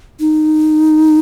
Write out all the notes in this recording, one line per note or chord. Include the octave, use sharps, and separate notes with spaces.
D#4